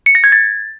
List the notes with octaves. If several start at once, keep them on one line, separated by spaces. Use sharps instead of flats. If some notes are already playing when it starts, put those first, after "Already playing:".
C#7
A#6
G#6
A6